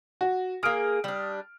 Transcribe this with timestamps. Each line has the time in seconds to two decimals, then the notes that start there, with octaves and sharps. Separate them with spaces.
0.21 F#4
0.63 A#3 G#4 D#6 F6 D7
1.04 G3 D4